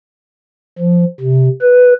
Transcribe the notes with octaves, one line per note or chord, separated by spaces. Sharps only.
F3
C3
B4